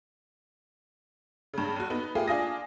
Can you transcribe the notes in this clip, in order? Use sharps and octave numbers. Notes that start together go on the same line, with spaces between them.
G2 C#3
F#1 F#4
B3 D#4
A3 A#3 F4 G4 G#4
D4 F4 F5 G#5 D#6 A#6